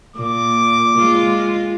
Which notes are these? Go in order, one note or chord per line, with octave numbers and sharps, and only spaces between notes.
A#2 D6
G#3 F4